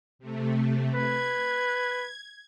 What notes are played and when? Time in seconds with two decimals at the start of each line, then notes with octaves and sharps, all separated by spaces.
0.19 C3 A3
0.94 B4 G#6